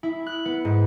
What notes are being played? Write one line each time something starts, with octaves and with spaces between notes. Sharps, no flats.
E4
F#6
B3
G#2